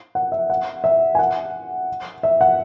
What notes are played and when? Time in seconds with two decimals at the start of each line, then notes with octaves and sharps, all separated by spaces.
0.15 F#5
0.32 E5
0.50 F#5
0.84 E5
1.15 G#5
1.19 F#5
2.23 E5
2.41 F#5